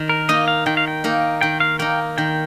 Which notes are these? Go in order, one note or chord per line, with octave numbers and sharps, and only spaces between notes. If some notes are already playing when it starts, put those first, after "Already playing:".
Already playing: D#3
A#4
A#3 D#4 D#5
F5
D#3 G5
F5
G5
A#3 D#4
D#3 G5
F5
A#3 D#4 G5
D#3 G5